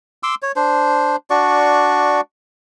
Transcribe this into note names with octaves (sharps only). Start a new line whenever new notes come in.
C6 D6 E6
C#5
D4 C5
D4 F#4 D5 C#6